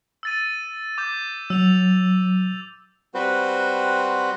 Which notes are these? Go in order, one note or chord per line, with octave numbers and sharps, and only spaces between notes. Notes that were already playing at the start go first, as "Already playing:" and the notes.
E6 A6 D#7
D6 G6
F#3 E6 F7
G3 C4 F#4 B4 C5